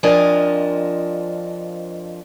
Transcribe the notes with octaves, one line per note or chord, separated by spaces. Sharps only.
F2 F3 D4 A#4 D#5 G#5